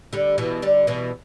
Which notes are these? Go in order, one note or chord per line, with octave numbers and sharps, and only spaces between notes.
D3 G3
B2 E3
D3 G3
B2 E3